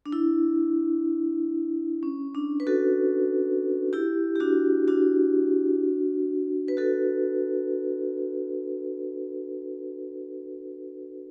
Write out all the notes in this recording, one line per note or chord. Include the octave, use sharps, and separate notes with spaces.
D4
E4
C#4
D4
B4
F#4 A4
E4 G4
G4
D4 F#4
D4 F#4
B4
F#4 A4